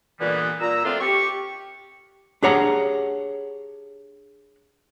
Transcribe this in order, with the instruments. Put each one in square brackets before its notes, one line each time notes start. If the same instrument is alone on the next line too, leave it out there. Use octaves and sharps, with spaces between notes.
[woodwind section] A#2 D3 E3 G3 G#3 B3
A#2 A#5 E6
F3 A3 C4 D4 F4
G4 C#6
[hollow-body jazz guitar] D4 G4 G#4 C#5 F#5 A#5